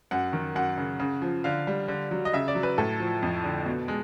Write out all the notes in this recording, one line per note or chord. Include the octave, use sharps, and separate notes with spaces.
F#2 F#5
D#3
F#2 F#5
C#3
C#3
F3
D3 F5
G3
D3
F#3
D#5
C#3 E5
D5
F#3
B4
A2 A4
F3
F2
D3
B2
G#3